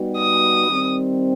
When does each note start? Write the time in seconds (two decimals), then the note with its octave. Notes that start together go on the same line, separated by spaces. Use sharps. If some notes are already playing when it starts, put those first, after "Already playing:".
Already playing: G3 B3 D#4 F#4
0.18 D#6
0.68 D#3 G3 C4